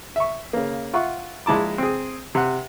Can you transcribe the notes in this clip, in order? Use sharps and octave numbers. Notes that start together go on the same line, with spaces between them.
E5 C#6
C#3 A#3
F4 E5 F#5 C#6
A#1 G#3 E4 A5 D6
C4 G#4
C3 F#5